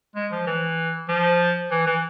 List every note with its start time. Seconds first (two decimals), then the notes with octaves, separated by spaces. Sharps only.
0.16 G#3
0.32 F3
0.47 E3
1.09 F3
1.71 E3
1.87 E3